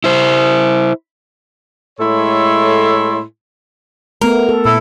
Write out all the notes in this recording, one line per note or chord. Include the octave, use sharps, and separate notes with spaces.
E4 C5
A2 G#3 E4 A4 C#5 C6
A3 B3 A#4
A4
A#2 E4 A4